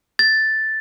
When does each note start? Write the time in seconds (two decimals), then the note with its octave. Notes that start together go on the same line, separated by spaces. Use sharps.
0.19 A6